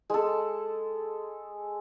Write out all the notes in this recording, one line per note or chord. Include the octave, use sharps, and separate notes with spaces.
G#3 A4